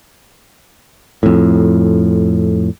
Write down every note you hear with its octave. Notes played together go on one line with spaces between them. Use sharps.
F2 A2